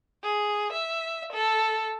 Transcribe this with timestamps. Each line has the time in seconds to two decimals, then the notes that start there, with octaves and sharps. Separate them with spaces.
0.23 G#4
0.72 E5
1.33 A4